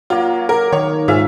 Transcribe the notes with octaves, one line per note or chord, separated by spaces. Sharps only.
F#3 A#3 F4
A#4
D#3 C#5
G#2 F4 G#4 E5 F5